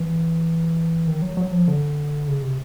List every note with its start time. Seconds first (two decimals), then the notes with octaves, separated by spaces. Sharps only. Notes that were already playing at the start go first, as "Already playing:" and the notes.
Already playing: E3
1.07 D#3
1.22 F#3
1.37 F#3
1.52 F3
1.68 D3
2.28 C#3
2.42 C3